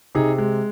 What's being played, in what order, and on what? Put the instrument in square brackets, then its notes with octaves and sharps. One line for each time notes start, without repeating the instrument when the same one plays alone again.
[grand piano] C3 D#4 G#4
G#3